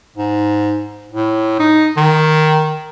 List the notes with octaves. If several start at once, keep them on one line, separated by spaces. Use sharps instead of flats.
G#2
A2
D#4
D#3